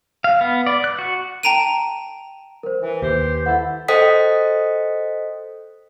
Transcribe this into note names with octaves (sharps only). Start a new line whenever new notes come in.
F5
B3
D5
F#6
F#4
G5 A5 A#5 D7 D#7
A#4 C5
E3
D#2 G4 B4 C5
E4 A4 F#5
A4 C5 D#5 G5 D#6 B6